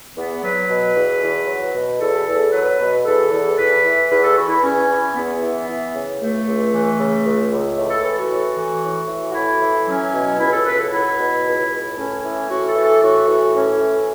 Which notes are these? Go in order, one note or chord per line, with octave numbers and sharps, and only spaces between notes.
E2 B3
F#3 B4
B2
E2
E2
F#3
B2
E2 A4
E2
F#3 B4
B2
E2 A4
E2
E2 B4
E3
E2 B4
A4
E3 F#4
E4
E2 C#4
E3
E2 B3
E3
E3
C#3
C#2 A3
C#2
E3
C#3
C#2
C#2
A2
A4
E3 A4
F#4
A2
E3
A2
E3
F#4
A2 E4
E3
F#3 C#4
B2
C#2 E4
A4
C#2 B4
A4
F#3 E4
B2
C#2
C#2
A2 C#4
E3
A2 F#4
A4
E3
A4
A2 F#4
E3
A2 C#4
E3